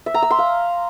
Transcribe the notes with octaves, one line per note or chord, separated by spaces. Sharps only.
E5
A#5
E6
C6
F5